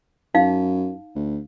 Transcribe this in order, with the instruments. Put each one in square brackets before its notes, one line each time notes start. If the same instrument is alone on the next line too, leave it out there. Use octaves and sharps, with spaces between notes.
[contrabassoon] F#2 [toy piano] D#4 F5
[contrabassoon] D2